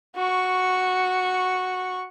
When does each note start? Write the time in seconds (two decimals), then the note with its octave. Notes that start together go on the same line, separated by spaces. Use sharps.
0.16 F#4 C#6